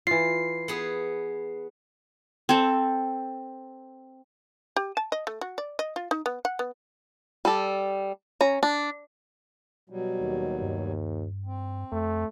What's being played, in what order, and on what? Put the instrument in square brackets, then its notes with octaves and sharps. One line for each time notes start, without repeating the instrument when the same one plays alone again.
[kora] E3 F4 [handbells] C7
[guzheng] B3 G#4
[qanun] C4 A4
[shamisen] G4
A5
D#5
A3
F#4
D5
D#5
F4
D#4
B3
F#5
B3
[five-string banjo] G3 A4
C#4 A#5
D4
[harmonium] B2 F#3 G3
[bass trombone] D#2
[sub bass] G2
[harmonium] C4
[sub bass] F2 [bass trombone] A3